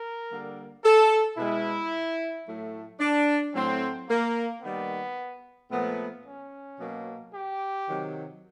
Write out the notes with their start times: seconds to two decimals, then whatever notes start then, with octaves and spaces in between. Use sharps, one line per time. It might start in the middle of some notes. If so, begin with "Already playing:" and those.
Already playing: A#4
0.30 D3 G3 A#3
0.84 A4
1.37 B2 G#3 E4
2.46 A2 F#3 A3
3.00 D4
3.54 A2 F#3 A3 C4
4.09 A#3
4.62 D#3 G3 A#3 B3
5.70 A#2 F3 A3 B3
6.25 C#4
6.79 B2 F#3 A#3
7.34 G4
7.87 C3 D#3 F#3